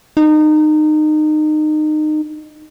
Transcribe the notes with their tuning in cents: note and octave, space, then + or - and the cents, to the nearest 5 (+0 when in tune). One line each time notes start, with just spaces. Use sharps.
D#4 -25